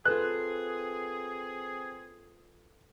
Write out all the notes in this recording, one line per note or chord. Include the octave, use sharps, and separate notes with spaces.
C4 F4 G#4 A4 B4 F#6